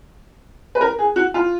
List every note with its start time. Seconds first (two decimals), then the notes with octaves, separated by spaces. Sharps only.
0.75 B4
0.81 A#4
0.99 G#4
1.16 F#4
1.34 F4